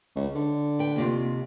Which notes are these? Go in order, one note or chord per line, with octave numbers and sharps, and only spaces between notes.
C#2
D3
B4 G5
D#2 C3 F4